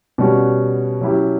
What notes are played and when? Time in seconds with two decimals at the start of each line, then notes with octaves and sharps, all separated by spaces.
0.18 B2 G3 C#4 F#4
1.01 F#3 C#4 E4 G4